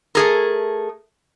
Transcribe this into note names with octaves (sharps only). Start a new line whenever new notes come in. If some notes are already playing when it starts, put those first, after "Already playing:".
A3 G#4 A#4